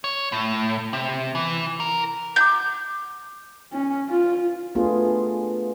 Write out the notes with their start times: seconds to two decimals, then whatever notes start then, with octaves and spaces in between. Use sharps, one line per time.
0.04 C#5
0.32 A2
0.93 C3
1.35 E3
1.80 A#4
2.36 F#5 A#5 D6 G6
3.72 C#4
4.09 F4
4.75 A3 B3 D4 F4 G#4